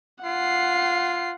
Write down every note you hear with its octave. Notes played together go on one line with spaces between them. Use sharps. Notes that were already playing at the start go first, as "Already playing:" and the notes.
F4 F#5 C7